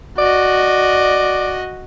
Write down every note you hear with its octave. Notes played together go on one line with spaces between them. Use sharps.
F#4 D5 D#5